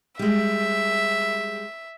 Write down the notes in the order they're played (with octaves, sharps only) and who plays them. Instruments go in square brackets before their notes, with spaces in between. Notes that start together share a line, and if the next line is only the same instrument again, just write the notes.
[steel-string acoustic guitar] G3 G#3 [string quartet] E5